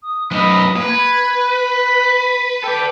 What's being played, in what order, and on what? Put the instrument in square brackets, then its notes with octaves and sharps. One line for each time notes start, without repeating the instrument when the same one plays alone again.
[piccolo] D#6
[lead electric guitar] F#2 D#4 [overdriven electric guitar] B4 B5 [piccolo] D#6
[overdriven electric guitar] A#3 [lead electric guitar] B4
[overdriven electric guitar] B5 [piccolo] G#6
[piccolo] B6
[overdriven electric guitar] A4 D5 [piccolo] G5